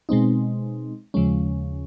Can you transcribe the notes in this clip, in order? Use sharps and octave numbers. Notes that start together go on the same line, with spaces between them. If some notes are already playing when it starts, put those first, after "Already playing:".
B2 G#3 C4 D#4
D#2 C#3 F3 G#3 C#4